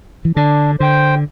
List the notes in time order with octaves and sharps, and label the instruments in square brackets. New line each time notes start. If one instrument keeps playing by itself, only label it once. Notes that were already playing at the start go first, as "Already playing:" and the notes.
[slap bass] E3
[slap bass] D3 [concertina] D4
[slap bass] D3 [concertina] C5 G5